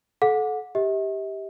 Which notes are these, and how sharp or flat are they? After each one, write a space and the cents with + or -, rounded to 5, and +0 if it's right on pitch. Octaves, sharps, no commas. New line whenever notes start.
A4 -30 F#5 -30
G4 +0 E5 -45